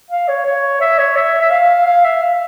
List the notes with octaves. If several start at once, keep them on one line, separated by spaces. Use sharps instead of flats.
F5
C#5
C#5
E5
C#5
E5
E5
F5
F5
E5
F5